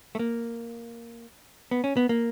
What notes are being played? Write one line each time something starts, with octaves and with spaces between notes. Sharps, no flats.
A3
A#3
B3
C#4
B3
A#3